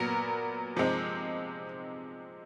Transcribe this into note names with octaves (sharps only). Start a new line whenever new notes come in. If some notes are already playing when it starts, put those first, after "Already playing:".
Already playing: A#2 F#3 B3 A#4
C3 F3 G#3 C4 D#4